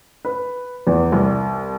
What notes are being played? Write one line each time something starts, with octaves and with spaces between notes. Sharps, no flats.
B4
E2
C2